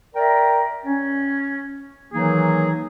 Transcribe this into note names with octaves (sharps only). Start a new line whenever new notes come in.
A#4 D5 E5 G5 A#5
C#4
D#3 E3 F#3 A#3 D#4 G#4